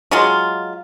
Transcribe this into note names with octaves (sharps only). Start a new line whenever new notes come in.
F#3 G#3 F4